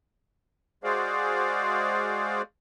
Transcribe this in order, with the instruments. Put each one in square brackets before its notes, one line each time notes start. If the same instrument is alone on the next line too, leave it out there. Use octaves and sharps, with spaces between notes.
[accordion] G#3 F#4 G#4 C5 D5 F5